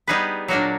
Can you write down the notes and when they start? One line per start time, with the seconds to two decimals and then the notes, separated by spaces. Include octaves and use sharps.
0.08 G3 B3 D#4 G#4 B4
0.48 A#2 F#3 A#3 D4 F#4